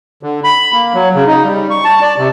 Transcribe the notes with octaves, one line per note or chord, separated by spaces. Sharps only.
D3
B5
A#3
F#3
C#3
D#4
G3
C#6
A5
D5
C3